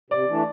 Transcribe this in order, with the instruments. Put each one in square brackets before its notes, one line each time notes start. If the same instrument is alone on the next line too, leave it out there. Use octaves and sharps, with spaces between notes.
[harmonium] C3 [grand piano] D5
[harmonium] E3 A3 D4